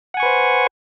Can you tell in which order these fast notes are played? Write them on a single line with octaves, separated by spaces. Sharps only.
F#5 G#5 C#6 B4 C5